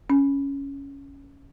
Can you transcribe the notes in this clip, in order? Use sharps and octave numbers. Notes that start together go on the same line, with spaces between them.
C#4